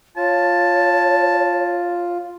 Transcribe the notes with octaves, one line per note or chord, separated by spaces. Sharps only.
F4 C#5 A5